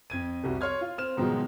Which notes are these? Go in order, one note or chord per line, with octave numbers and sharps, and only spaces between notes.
F2 G#6 D#7
C2 F2 G3 F#4
C#5 C6 F6 G#6
F4
C4 F6 E7
G#2 B2 D#3 F3 F#3 G#3